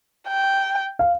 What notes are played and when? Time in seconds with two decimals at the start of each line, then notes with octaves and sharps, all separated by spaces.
0.29 G5
0.99 F5